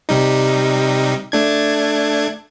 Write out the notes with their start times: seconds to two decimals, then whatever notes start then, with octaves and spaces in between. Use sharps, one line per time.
0.09 C3 G3 D#4
1.32 A3 D4 G#6